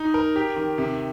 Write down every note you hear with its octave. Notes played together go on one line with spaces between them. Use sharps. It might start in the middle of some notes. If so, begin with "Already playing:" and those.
Already playing: D#4
A#4
G4
D#3
C3